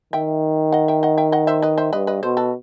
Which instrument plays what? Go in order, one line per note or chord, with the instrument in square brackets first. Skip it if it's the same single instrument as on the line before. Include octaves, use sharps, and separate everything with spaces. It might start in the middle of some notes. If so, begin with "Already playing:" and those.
[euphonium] D#3 [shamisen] E5 G5
[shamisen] D#5 F#5
E5 G5
D#5 F#5
E5 G5
D#5 F#5
C5 E5
B4 D#5
C5 E5
[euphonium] G2 [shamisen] B4 D#5
[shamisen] B4 D#5
[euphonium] B2 [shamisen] A4 C5
[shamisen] F#4 A4